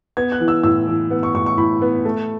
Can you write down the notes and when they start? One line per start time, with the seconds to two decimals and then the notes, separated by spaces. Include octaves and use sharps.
0.17 B3 G#6
0.32 F#6
0.40 E3
0.48 E6
0.63 A2 E6
0.88 E3
1.11 B3
1.23 C#6
1.34 A2 C#6
1.46 C#6
1.57 A2 B5
1.82 B3
2.05 A3